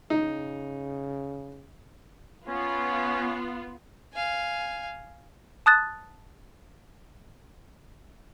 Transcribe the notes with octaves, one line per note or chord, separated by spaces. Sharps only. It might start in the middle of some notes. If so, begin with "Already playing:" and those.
C#3 D#4
B3 C#4 F4
F5 G#5
A5 D#6 F#6 A6